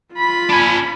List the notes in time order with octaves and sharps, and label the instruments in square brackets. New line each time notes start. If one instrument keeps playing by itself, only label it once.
[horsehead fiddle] F4 B5
[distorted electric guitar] D4 G#5